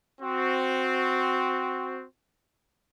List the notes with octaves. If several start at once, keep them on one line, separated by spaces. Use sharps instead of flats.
C4 F#4